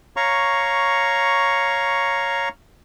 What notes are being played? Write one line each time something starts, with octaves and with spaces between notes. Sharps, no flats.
C#5 F5 A#5 C#6